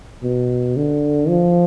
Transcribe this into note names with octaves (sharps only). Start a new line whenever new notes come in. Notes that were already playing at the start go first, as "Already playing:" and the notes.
B2
D3
F3